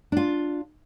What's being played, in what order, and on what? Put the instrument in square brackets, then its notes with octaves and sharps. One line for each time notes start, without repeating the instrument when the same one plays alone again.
[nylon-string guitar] D4 F4